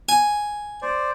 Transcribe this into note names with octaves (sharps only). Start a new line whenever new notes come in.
G#5
C5 D5